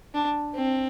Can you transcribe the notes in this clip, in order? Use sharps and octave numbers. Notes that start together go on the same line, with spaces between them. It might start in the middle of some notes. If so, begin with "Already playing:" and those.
D4
C4